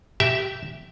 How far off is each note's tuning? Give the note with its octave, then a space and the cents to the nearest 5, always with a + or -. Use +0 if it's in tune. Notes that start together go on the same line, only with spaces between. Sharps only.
G4 -20 E5 +0